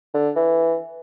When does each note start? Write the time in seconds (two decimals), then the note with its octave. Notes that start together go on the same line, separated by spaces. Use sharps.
0.14 D3
0.36 E3